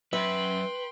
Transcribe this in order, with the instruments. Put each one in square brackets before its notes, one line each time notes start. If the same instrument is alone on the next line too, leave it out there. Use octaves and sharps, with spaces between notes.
[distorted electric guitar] F#2 [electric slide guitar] B4 [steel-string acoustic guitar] E5 [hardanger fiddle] G5 C6